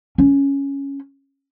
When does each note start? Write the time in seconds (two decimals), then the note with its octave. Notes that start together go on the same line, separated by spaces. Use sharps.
0.18 C#4